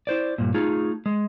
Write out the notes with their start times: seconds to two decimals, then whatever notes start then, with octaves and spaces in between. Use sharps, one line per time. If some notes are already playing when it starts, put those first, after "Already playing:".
0.07 E4 C5 D5
0.38 G2 A#2
0.54 A3 D#4 F4 G#4
1.06 G#3